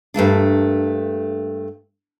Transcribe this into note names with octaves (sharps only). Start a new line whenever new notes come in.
G2 A3 A#3 D4